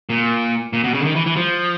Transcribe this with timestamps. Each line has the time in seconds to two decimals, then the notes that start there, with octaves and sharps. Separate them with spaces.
0.10 A#2
0.73 A#2
0.84 B2
0.94 C#3
1.00 D3
1.05 D#3
1.15 E3
1.26 E3
1.36 F3